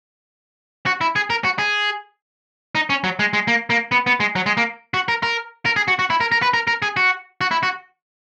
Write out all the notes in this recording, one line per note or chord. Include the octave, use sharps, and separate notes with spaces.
F#4
E4
G#4
A#4
F#4
G#4
D#4
C#4
F#3
G#3
G#3
A#3
A#3
B3
B3
G#3
F#3
G#3
A#3
F#4
A#4
A#4
A#4
G#4
F#4
F#4
E4
A#4
A#4
B4
A#4
A#4
G#4
F#4
F#4
E4
F#4